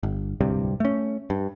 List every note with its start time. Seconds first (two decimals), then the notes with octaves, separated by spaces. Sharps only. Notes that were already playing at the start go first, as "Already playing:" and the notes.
0.03 G1
0.41 D1 C2 G2 C3
0.80 A3 C#4
1.30 G2